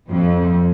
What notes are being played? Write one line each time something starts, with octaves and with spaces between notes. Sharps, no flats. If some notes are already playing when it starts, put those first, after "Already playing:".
F2